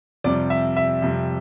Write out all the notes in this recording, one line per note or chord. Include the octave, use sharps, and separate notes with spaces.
F2 C3 G3 D5
E5
E5
F2 C3 G3